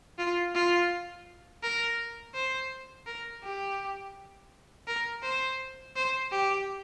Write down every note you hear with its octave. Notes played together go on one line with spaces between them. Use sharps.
F4
F4
A#4
C5
A#4
G4
A#4
C5
C5
G4